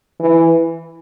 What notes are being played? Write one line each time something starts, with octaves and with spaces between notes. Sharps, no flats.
E3